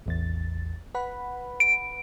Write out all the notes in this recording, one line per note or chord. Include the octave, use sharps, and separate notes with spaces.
A1 E2 A6
B4 F#5 B5
D7